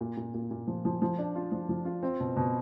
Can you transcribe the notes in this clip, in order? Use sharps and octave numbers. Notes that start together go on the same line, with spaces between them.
A#2
A#2
A#2
A#2
F3
F3
F3
D4
F4
F3
F3
F4
C4
B2
B2